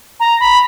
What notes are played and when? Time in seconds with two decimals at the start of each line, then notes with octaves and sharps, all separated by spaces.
0.20 A#5
0.40 B5